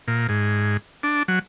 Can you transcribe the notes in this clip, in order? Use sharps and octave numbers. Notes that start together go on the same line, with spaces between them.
A#2
G#2
D4
F#3